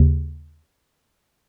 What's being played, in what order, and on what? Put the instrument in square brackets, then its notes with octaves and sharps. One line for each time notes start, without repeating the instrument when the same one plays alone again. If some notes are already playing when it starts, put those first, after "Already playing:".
Already playing: [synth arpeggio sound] D#2 C#3